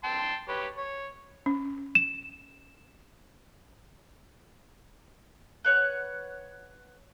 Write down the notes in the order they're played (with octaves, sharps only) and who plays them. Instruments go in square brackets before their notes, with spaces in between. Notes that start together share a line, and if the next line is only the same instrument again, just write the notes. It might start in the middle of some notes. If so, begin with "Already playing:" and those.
[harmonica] G5 A5 C6
G4 B4 C#5
C#5
[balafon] C#4
[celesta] E7
[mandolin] B4 C#5 F#5